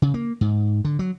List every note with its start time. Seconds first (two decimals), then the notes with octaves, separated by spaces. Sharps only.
0.02 C#3
0.14 A#3
0.41 G#2
0.85 D3
0.99 F#3